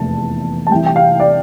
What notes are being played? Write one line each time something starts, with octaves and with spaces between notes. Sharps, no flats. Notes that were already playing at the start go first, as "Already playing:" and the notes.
Already playing: F1 E2 E3 A#3 A5
A5
C2 C3 E3 G5
G5
F5
D5